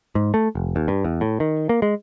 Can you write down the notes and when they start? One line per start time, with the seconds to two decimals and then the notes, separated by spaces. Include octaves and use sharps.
0.15 G#2
0.34 A3
0.55 F1
0.76 D#2
0.88 G2
1.05 E2
1.21 A2
1.40 D#3
1.69 A#3
1.82 G#3